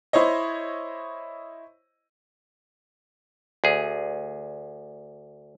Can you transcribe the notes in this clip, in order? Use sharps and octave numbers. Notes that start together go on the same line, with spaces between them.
E4 C5 C#5 D#5
D2 G#4